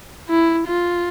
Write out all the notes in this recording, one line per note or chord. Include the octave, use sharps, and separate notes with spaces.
E4
F4